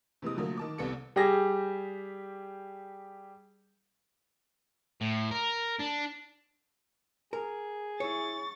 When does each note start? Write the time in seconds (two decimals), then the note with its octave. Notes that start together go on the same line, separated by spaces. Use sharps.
0.22 C3 E3 G#3 D#6
0.37 D3 F3 F#3 A3 A#3
0.57 D#3 A5 D6
0.78 C2 C3 B3 A4 C#7
1.16 G3 G4 G#4 A#6
5.01 A2
5.31 A#4
5.79 D4
7.33 G#4 A#4
8.00 E4 C#5 C#6 A6